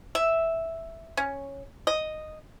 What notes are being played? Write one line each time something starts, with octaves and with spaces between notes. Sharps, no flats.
E5
C#4
D#5